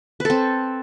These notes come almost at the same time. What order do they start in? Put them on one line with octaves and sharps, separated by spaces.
B4 A4 C4